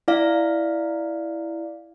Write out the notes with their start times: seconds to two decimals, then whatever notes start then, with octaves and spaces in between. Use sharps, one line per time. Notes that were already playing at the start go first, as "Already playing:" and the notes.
0.08 E4 D5 F5